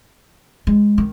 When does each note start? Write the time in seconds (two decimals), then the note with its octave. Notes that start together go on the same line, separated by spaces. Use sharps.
0.67 G#3
0.98 D#3